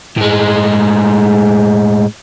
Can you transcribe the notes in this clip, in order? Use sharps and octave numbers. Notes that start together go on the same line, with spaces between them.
A2 G#3